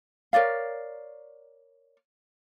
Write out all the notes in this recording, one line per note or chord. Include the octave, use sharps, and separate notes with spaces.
A#4 C#5 D5 F5